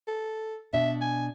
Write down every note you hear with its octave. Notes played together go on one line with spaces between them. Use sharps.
A4
B2 D4 E5
G#5